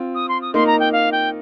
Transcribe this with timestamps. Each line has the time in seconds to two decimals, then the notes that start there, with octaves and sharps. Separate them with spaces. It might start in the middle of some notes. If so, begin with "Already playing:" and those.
Already playing: C4 F4
0.15 D#6
0.29 C6
0.42 D#6
0.54 A#3 D#4 C6
0.67 A#5
0.80 G5
0.92 F5
1.12 G5